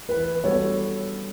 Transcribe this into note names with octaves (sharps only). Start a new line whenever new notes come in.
E3 B4
G3 B3 F#4 A4 C#5